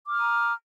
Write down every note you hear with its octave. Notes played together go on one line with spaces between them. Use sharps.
A#5 D6 D#6 F6